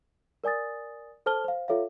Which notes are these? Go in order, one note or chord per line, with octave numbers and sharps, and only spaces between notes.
A#4 D5 G#5 D#6 A6
A4 C5 A5 F6 G7
C5 F5
F4 A4 C#5 E5 F5